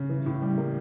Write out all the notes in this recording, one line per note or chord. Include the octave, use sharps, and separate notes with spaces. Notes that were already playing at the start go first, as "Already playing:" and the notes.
Already playing: C#3
E3
A2
G3
A#3